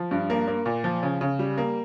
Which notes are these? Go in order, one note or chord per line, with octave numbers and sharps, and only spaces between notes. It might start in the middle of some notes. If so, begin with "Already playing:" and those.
Already playing: F3
G2
A#3
A#3
A#2
F3
C#3
C#3
G3
A#3